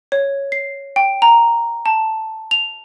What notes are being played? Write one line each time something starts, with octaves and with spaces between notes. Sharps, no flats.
C#5
C7
G5
A#5
A5
F7